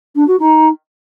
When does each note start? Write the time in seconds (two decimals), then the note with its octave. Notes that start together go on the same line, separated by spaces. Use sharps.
0.16 D4
0.28 F#4
0.40 D#4